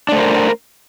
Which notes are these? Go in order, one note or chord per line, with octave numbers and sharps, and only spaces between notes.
A3 D4 A#4 C5